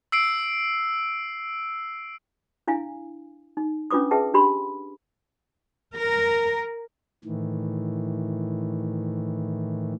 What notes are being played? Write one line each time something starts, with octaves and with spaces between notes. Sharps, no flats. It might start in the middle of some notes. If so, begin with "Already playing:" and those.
E6 C7 D7
D4 E4 F5 G#5
D#4
C#4 D4 F4 B4 D6 D#6
G#4 B4 E5 G5 A5
D4 G4 B5 C6
A#4
A2 D#3 E3